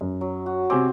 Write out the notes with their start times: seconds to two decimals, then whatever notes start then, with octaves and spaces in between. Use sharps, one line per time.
0.01 F#2
0.21 F#3
0.46 F#4
0.70 C3 C4 G#5 D6